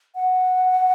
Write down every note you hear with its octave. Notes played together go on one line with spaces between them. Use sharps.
F#5